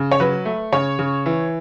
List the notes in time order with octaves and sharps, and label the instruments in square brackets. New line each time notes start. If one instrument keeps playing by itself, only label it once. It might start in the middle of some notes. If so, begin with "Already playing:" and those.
Already playing: [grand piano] C#3
C#5
F#3 B4
A3
C#3 C#5
C#3
E3